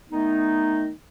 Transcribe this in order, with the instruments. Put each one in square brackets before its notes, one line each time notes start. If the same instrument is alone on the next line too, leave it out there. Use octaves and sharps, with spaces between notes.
[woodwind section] D#3 A3 B3 D#4